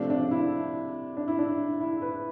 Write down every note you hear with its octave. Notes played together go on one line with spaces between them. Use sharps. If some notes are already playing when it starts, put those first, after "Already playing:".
Already playing: C3 F3 A3 C4 D4
D4
E4
D4
E4
D4
E4
B4